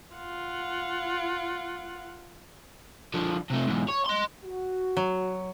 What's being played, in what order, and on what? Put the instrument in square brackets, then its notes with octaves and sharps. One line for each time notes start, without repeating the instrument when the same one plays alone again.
[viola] F4 F#5
[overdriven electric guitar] D3 F3
C3 A3
E2 G#2
C#5
D#5 C6
[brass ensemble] F#4
[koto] F#3